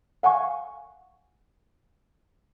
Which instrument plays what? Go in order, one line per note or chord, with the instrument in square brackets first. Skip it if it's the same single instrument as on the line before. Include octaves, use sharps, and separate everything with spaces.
[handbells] F5 F#5 G#5 C#6